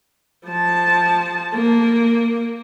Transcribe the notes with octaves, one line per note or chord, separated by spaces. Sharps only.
F3 A5
A#3